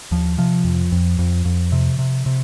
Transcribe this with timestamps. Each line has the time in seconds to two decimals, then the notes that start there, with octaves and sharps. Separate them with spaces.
0.11 D#2 F3
0.38 C3 F3
0.65 F2
0.92 F2
1.19 F2
1.45 F2
1.72 C3
1.99 C3
2.26 C3